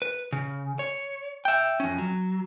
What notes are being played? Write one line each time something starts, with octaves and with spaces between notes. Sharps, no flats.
B4
C#3
C#5
E5 G5
F2 C#4
F#3